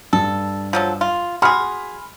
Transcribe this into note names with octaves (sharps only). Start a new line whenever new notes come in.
G2 A4
F3 F#3 A4
F4
F#4 G#4 B5 C6 F6